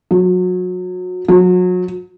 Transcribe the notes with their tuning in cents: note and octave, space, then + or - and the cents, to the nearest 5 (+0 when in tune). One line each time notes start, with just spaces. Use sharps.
F#3 -25
F#3 -30